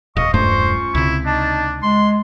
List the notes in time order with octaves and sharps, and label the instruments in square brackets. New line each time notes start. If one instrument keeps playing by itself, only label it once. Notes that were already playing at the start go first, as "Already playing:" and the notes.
[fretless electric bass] D#1 [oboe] D#5 [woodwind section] F5 C#6
[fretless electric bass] E1 G2 A3 [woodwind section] C#4 F4 C#6 [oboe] C5
[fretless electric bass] C#2 C3 [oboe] E4
[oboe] D4 [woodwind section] D#4 D#5 A5
[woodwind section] G#3 [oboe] C6